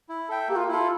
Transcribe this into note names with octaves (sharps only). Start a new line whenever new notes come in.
E4
A4 E5 G5
A#3 G4
F4
E4 F4 A4